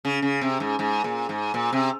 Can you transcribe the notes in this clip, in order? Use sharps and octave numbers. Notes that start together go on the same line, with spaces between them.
C#3
C#3
C3
G#2
G#2
A#2
G#2
A#2
C3